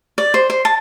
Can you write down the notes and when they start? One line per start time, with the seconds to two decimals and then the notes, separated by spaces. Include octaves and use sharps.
0.18 D5
0.34 C5
0.50 C5
0.65 A5